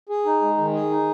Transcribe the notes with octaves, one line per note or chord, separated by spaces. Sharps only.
G#4
D#4
G#3
D#3
G#4
D#4